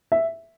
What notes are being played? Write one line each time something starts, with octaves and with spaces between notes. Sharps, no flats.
E5